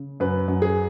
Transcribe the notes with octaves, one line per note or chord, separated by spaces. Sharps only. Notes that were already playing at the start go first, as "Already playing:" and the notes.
Already playing: C#3
F#2 B4
F#2
G#4